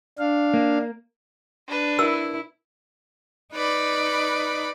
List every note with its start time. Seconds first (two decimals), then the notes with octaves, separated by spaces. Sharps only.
0.19 D4 F5
0.54 A#3
1.67 D4 B4
1.99 E4 A#4 E6
3.53 D#4 B4 D5 B5